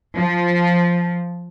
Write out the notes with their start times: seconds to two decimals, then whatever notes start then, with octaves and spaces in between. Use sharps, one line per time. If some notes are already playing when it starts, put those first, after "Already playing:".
0.16 F3